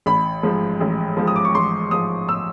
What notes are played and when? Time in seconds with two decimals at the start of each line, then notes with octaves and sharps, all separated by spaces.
0.06 A1 B5
0.43 G#2 F3
0.80 A1
1.17 G#2 F3
1.27 D#6
1.36 D6
1.45 C#6
1.55 A1 C6
1.91 G#2 F3 D#6
2.29 E6